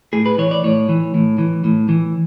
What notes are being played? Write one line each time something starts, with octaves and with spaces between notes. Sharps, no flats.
A2 G#4
B4
E3 C#5
D5
A2 C#5
E3
A2
E3
A2
E3